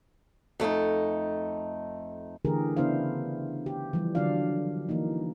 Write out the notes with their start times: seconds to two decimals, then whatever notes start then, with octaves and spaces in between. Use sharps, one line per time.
0.60 F2 A3 C#4 D#4
2.45 D3 E3 A3 G4 G#4 A#4
2.77 C#3 B3 D4 E4 C5 F5
3.66 G4
3.93 E3 F3 G3
4.15 D3 F#3 D4 F4 D5 F5
4.89 E3 A#3 D#4